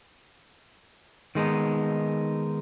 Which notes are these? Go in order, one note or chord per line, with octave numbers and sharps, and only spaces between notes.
D#3 G#3 B3 D#4